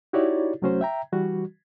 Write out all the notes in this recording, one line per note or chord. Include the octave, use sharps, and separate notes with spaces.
D#4 E4 F#4 G4 C#5 D5
C2 F#3 A3 C#4 F#4 C5
E5 G5 A#5
E3 G3 F#4